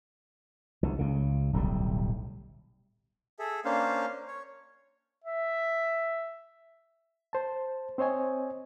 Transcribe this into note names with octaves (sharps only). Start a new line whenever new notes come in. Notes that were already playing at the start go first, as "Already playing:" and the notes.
C2 D3
C#2 C#3
D1 B1 A2 G3
G#4 A4 E5
A#3 C#4 D4 C5 F5
C#5
E5
C5 A5
C4 C5 C#5 D#5 G#5